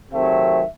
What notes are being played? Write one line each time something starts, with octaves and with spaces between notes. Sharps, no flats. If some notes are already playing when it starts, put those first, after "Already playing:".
C3 D#3 F#3 A3 C4 E5